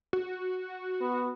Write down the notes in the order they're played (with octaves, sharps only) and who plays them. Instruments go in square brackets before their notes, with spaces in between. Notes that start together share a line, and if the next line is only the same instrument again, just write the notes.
[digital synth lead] F#4
[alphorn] B3